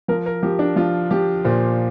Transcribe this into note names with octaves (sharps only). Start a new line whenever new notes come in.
F3 A#4
A#4
F3 G4
D4
F3 F4
F3 G4
A#2 C5